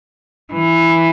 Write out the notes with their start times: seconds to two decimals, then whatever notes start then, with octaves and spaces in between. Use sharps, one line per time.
0.53 E3